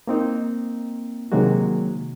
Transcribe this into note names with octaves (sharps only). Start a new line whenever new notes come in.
A#3 C4 D#4
C3 D#3 F#3 G#3 A#3 F#4